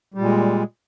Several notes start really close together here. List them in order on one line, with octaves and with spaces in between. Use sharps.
G3 A#2 G#3